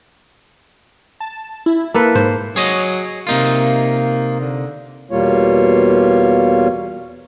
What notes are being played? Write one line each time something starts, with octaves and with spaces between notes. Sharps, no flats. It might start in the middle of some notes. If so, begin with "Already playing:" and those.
A5
E4
A#3 A4 B4
G#2 C5
F#3 G#4 C#5 D#5
C3 A#3 D#4 F4
D3
E2 B2 G3 A#3 F4 C#5